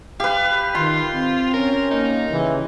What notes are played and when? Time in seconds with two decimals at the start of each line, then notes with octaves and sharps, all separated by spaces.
0.20 G4 B4 F5
0.75 D#3 F4 C6
1.13 C4
1.54 C#4 A#4
1.91 A#3 D#4
2.31 C#3 E3